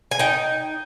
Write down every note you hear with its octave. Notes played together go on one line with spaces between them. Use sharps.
G#5
D#4 G5